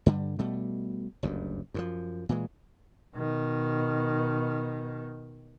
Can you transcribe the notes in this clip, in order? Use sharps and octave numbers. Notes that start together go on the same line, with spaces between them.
G2 D3 G3
B2 G3 A3
F#1 D2 G2
F#2 A#2 F3
A#2 E3 G#3
B2 D#3